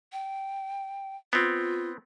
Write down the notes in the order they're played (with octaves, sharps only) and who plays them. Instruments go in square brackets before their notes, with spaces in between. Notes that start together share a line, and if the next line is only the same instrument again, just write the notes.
[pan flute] G5
[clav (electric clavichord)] B3 C4 [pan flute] F4